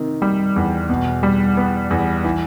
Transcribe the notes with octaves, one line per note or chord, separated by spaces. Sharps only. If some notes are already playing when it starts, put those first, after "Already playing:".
Already playing: C3 D#3
G3
E2
B2
G3
B3
E2
E3